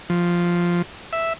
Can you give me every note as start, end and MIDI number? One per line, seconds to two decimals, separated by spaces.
0.10 0.82 53
1.13 1.33 76